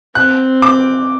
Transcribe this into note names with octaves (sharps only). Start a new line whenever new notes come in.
C4 F#6
D6